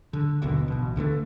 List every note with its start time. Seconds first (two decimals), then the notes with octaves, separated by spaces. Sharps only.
0.13 D3
0.42 D#1 B1 B2 D3
0.68 A1 B2
0.96 C#2 D3 F3 A3